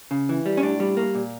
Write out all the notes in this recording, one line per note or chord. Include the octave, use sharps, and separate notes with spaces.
C#3
E3
G3
C#4
A2 D4
G3
A#3
A#2